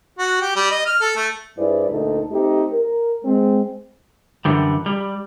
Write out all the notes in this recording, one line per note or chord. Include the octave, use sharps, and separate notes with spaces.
F#4
G4
G3
D#5
F6
A4
A3
G2 E4 G#4 B4 C5 D5
D2 A#2 A3 D#4 A4
A3 C4 D#4 G4
A#4
G#3 C4
F#2 D3 E3 G3
G3